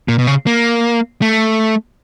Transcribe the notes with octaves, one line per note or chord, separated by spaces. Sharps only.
A#2
B2
C#3
A#3
A3